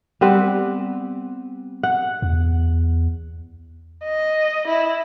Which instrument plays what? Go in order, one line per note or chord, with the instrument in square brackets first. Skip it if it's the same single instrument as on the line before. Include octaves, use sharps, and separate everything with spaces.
[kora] G3 B3 C4 B4
F#5
[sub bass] E2
[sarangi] D#5
E4